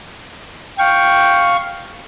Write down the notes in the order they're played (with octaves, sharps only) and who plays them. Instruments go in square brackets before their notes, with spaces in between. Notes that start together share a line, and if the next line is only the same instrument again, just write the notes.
[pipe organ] F5 C#6 [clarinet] G5